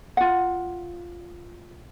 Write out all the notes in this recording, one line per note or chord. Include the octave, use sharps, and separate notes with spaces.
F4 F#5